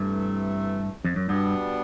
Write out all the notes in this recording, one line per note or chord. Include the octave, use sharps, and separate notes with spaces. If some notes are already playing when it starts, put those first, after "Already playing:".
Already playing: G2 C3 E3 A3
F2
F#2
G2 B2 G3 B3 D4